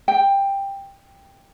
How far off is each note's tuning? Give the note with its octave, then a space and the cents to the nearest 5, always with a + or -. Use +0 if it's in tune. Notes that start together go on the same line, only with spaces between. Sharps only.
G5 +10